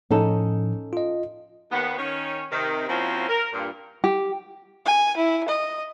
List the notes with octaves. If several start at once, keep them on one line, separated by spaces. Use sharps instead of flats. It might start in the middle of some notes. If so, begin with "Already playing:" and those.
A2 F3 C#4 D#4 A4
F4 D#5
D#2 B3
D#3 C#4 C#5
C3 D#3
F3 A#3 C4 C#4 E4 F#4
A#4
G2 A#2
G4
G#5
E4
D#5